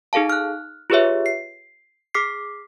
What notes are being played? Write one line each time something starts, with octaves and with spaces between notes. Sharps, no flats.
D#4 G#4 A4 F5 A5
F6 F#6
F4 G4 G#4 B4 C#5 E5
C7
G#4 D6 F6 B6 C7